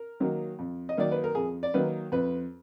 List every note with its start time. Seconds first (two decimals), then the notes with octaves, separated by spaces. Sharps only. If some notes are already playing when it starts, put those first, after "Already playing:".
Already playing: A#4
0.20 D#3 F#3 A#3
0.59 F2
0.89 D#5
0.97 D#3 F#3 A#3 D5
1.12 B4
1.24 A#4
1.35 F2 G#4
1.63 D5
1.74 D#3 F#3 A#3 B4
2.12 F2 B4